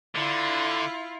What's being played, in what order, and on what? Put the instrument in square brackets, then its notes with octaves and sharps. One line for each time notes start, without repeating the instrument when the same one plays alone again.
[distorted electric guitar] D3 [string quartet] E4 F4